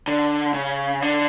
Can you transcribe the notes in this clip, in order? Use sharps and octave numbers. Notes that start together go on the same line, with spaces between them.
D3
C#3
D3